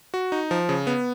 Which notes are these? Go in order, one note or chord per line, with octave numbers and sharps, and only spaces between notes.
F#4
D#4
F3
C#3
B3